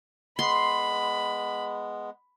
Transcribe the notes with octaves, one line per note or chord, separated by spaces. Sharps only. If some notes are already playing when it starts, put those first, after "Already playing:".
G#3 B3 B5 C6